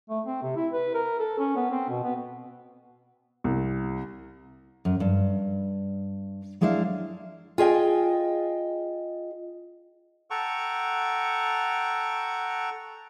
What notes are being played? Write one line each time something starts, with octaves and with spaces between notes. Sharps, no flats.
A3
C4
C3
E4
B4
A#4
A4
C#4
B3
C4
B2
B3
C2
F#2
G2
F#3 G#3 D4 E4 E5 F5
F4 G#4 D#5 G5
A4 F#5 G5 A5 A#5 C#6